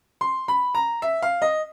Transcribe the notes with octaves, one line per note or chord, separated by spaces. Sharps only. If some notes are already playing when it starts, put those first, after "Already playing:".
C6
B5
A#5
E5
F5
D#5